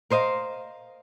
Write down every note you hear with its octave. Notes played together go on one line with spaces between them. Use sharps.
A#4 C5 D#5 F5